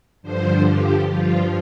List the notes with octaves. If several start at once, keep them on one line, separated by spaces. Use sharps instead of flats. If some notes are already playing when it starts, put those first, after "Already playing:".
G2 D3 F3 C5
G4
G2 F3 F4